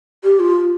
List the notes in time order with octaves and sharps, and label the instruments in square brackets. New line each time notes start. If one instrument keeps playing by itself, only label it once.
[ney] G4
F4